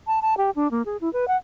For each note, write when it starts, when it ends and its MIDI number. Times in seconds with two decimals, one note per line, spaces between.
0.07 0.20 81
0.22 0.34 81
0.37 0.50 67
0.56 0.70 62
0.71 0.82 58
0.85 0.97 68
1.01 1.11 64
1.13 1.28 71
1.28 1.37 78